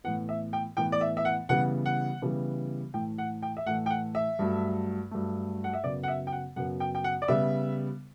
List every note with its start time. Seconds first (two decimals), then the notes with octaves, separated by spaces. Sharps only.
0.04 A2 E3 B3 F#5
0.29 E5
0.53 G5
0.77 A2 E3 B3 G5
0.92 D5
1.01 E5
1.17 E5
1.25 F#5
1.49 C#3 E3 G3 B3 F#5
1.86 F#5
2.22 C#3 E3 G3 B3
2.94 A2 E3 A3 G5
3.18 F#5
3.42 G5
3.57 E5
3.66 A2 E3 A3 F#5
3.86 G5
3.90 F#5
4.15 E5
4.39 G2 F#3 A3
5.11 G2 F#3 A3
5.64 F#5
5.73 E5
5.84 F#2 C#3 F#3 B3 D5
6.03 F#5
6.08 E5
6.27 G5
6.32 F#5
6.56 F#2 C#3 F#3 B3 F#5
6.80 G5
6.95 G5
7.04 F#5
7.22 D5
7.28 C#3 G3 B3 E5